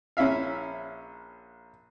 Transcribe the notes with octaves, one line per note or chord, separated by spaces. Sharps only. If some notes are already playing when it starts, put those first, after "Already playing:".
A#1 C#4 E4 E5 F5